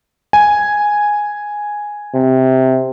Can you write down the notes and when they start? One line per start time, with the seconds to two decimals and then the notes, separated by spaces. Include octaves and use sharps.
0.33 G#5
2.14 C3